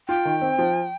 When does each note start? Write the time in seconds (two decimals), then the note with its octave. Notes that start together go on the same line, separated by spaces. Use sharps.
0.08 F4 G5
0.25 D#3
0.41 C4
0.59 F3